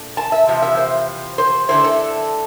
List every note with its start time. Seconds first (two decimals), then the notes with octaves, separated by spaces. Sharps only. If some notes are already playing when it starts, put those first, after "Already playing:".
Already playing: A#2 A3 D4
0.17 A5
0.32 E5
0.47 E2 C3 F3
0.62 E5
0.77 C5
1.38 C5
1.68 D3 A3 E4 C5
1.84 A4